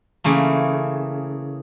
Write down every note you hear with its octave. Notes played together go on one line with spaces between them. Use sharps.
C#3 E3 A3 A#3